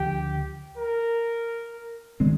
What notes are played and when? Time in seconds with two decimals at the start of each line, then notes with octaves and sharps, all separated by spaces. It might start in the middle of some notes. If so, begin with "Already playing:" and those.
Already playing: D2 D3 F3 G4
0.77 A#4
2.20 D#3 G#3 C4